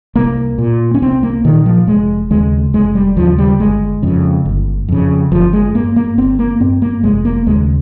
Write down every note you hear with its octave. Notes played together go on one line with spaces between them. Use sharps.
C2 A#3
A#2
C#4
C2 C4
A#3
A#2 D#3
F3
F1 G#3
D#2 C#3 G#3
F1 G#3
G3
D#2 C#3 F3
G3
G1 G#3
F2 C#3
G1
F2 C#3
G1 F3
G#3
G2 A#3
A#3
G1 C4
A#3
G2 C4
A#3
F1 G#3
A#3
D#2 C#3 G#3